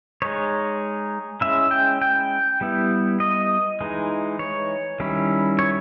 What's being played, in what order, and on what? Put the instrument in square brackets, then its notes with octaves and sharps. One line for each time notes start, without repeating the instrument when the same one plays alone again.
[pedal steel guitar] G#3 D#4 C#5
G#3 C#4 E4 E5
G5
G5
G3 B3 E4
D#5
E3 G#3 D#4
C#5
D#3 G3 C#4 E4
C#5